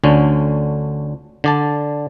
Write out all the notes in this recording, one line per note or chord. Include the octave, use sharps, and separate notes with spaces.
D2 D3 C#4
D3 D5 A5